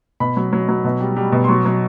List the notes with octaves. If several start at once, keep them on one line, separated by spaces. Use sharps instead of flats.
B2 B5
F#3
F#3
F#3
B2
G3
G3
B2
C6
F#3 C#6
F#3